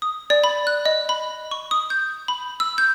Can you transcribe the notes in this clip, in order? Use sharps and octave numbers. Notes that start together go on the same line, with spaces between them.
D#6
D5
B5
F#6
D#5
B5
C#6
D#6
G6
B5
E6
G6